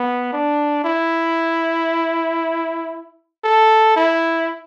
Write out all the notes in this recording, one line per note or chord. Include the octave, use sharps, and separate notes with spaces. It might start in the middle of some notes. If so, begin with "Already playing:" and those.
Already playing: B3
D4
E4
A4
E4